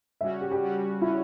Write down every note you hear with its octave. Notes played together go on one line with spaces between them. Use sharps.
C#3 G3 C#4 F#4 E5
G4
G4
C#3 G3 C#4 F#4
C#3 G3 C#4 E4 F#4